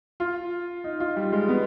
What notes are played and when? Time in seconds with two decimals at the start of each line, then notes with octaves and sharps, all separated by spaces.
0.20 F4
0.84 D#4
1.00 F4
1.16 G3
1.32 G#3
1.49 B3